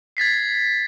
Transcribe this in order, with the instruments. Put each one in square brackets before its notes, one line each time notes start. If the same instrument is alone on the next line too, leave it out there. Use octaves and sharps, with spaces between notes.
[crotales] G#6 A6 B6 C7